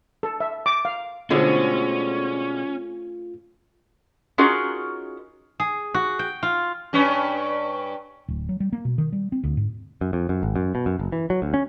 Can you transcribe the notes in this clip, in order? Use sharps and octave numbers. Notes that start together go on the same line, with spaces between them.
A4
E5
D6
F5
B2 D3 G#3 A3 C4 C#4 F4 G#4
C#4 D#4 F4 F#4 G#4 A#4
G#4
F#4
G5
F4
G2 C#4
D1
F#3
G3
A#3
B2
D#3
G3
C4
D2
G#2
F#2
F2
F#2
G#1
F#2
B2
F#2
F#1
E3
F#3
D2
C#4